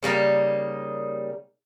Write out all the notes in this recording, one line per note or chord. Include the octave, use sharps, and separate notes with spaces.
C#3 G3 A#3 D#4